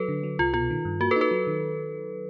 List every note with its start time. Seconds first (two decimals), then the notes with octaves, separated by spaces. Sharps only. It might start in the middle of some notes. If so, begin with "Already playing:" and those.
Already playing: F#3 A4 B4
0.08 D3
0.23 F#3
0.39 C2 F4
0.54 B2 F4
0.70 D#3
0.85 G2
1.00 A#3 F#4
1.11 A4 B4
1.16 D#4
1.21 A4 B4
1.31 F#3
1.47 D#3